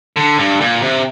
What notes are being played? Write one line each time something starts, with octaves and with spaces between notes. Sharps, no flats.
D3
G2
A#2
C3